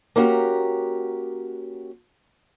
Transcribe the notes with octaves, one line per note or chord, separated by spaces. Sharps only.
A#3 C#4 E4 F#4 G4 A#5